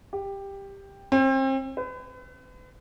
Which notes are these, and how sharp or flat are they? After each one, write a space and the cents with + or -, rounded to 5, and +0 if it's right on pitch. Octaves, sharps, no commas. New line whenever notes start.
G4 +10
C4 +35
B4 +40